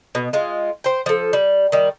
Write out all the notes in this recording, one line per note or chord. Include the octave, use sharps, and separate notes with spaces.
B2
G#3 F4
C5 G5
F3 A4
G3
D#3 G3